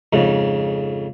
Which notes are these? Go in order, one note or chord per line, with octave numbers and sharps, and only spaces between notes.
F2 G#2 C#3